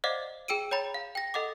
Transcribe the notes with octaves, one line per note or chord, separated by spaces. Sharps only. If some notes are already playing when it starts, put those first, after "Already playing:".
C5 D5 D#5 F5 F#5 D6
G#4 G5 E6 D7 D#7
C#5 G5 A#5 B5 A6
F5
G5 A#6
A4 D#5 F#5 D6